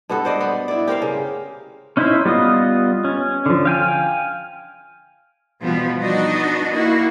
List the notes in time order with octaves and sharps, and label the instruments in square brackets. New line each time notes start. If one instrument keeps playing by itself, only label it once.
[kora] G2 B3 F#4 A4
C5 D5 D#5
B3
E4 D5
G4 A#4 C5 F5
C#3
[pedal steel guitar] C#4 D#4 E4 C5 E5
G3 B3 F4 D#5
C#4
D3 F3
F5 G5 G#5
[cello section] B2 E3 F3 G3 B3
B3 D4 D#4 F#4 D#5
A#3 E4 F#4